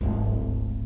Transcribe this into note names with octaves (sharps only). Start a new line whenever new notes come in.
D1 G#1